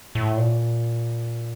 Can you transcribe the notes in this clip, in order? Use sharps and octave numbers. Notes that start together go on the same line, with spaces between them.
A2
A#2